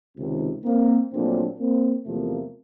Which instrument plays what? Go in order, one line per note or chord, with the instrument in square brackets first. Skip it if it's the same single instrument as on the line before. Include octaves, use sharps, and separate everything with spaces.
[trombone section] C#2 C3 D#3
A#3 C4
A#1 A#2 F#3 A3 C4 D4
A#3 C4
E2 C3 F3 A3 A#3